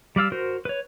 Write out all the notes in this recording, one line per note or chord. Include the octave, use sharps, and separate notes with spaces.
G3 D5 F5 E6
F#4 A#4 C5
B4 C#5